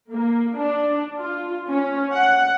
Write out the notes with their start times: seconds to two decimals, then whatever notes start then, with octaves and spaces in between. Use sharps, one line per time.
0.13 A#3
0.58 D4
1.20 F4
1.69 C#4
2.13 F#5